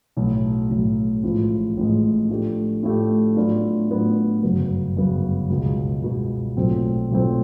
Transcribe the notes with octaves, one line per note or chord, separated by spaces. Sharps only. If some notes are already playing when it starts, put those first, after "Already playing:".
B1 A2 F#3
B1 A2 F#3
A1 A2 F3 G#3
A1 A2 F3 G#3
A2 F3 A3 D4 G4
A2 F3 A3 D4 G4
A2 F#3 B3 D4 F4
A2 F#3 B3 D4 F4
G1 F#2 C#3 F#3 B3
G1 F#2 C#3 F#3 B3
C#2 B2 G#3
C#2 B2 G#3
B1 A#2 F#3 A3 C4
B1 A#2 F#3 A3 C4